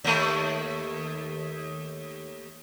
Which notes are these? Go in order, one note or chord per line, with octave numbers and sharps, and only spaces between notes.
D#2 A3